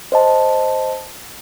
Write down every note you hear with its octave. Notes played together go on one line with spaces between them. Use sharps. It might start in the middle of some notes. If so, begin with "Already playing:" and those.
C5 D#5 A5